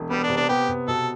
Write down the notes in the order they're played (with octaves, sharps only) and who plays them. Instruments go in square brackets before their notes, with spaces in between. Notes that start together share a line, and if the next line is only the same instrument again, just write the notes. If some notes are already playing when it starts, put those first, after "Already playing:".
Already playing: [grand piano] E1
[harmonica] G3 [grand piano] B3
[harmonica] D4
[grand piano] C3
[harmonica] D4
[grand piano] B3 [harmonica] G4
[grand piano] C3
[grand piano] B2 [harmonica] A4